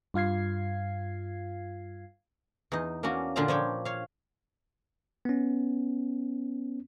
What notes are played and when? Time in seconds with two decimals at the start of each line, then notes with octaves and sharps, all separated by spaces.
0.14 G2 F4 F5 G#6 C7
2.72 E2 D#4
3.03 A#3 C#4 D4 F#4
3.36 A#2 D3 D4 F4 D5 A#5
3.48 F3 D4 C#5 G5
3.85 C#5 F5
5.25 B3 C#4